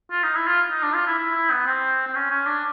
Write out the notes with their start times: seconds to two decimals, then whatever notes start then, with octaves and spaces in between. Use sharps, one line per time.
0.11 F4
0.23 D#4
0.35 E4
0.47 F4
0.71 D#4
0.83 D4
0.94 F4
1.07 E4
1.19 E4
1.35 E4
1.51 B3
1.67 C4
2.07 C4
2.15 C#4
2.30 C#4
2.47 D4